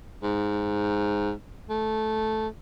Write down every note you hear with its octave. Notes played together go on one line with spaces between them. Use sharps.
G#2
A3